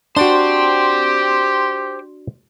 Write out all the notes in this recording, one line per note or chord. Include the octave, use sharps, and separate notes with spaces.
D4 F#4 G4 C5 G5 C6